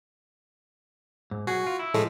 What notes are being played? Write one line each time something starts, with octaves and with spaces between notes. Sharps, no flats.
G#2
B1 F#4 G#4
F4
E4
A2 F3 G#3 A3